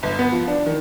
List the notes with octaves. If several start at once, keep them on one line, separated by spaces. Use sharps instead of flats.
G1
B3
F3
D4
D#3